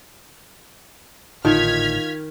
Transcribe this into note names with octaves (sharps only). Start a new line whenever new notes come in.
G#1 A2 D3 D#3 F4 F6 G#6 B6